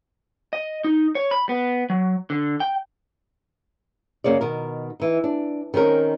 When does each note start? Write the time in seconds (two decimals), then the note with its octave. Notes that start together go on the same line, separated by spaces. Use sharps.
0.53 D#5
0.84 D#4
1.15 C#5
1.31 B5
1.49 B3
1.90 F#3
2.30 D3
2.60 G5
4.24 F#2 C#3 A#3 C#5 D5
4.41 B2 D#3 A#4
5.00 E3 D#4
5.24 D4
5.74 D#3 C4 C#4 A#4